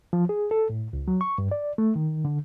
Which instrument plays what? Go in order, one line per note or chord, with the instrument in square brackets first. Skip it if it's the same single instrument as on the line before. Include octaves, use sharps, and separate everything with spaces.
[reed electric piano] F3
G#4
A4
A2
C#2
F#3
C#6
G2
D5
A3
D#3
D3